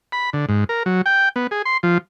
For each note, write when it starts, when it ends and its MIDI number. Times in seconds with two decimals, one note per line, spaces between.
0.12 0.30 83
0.33 0.46 50
0.49 0.64 44
0.69 0.83 70
0.86 1.02 54
1.06 1.29 79
1.36 1.47 59
1.51 1.62 68
1.65 1.77 84
1.83 1.98 53